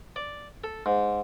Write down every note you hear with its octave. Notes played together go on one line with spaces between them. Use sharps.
D5
A4
G#2